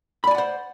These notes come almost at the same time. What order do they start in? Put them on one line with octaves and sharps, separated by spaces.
B5 D5 G#5 F#5 C5